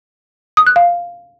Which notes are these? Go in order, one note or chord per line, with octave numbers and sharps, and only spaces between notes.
D#6
F#6
F5